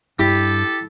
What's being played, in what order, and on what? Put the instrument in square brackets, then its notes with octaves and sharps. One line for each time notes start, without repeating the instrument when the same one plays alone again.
[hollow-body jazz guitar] G2 [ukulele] E4 [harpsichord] G4 [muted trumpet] A4